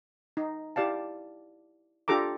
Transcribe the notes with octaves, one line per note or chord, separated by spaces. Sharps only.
D#4
E4 G4 D5 F5 A5
D4 F4 G4 A4 A#5 D6